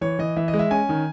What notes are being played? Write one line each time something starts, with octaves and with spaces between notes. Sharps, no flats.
E3 C#5
E3 D#5
E3 E5
D#5
G#3
E5
C#4 G#5
D#3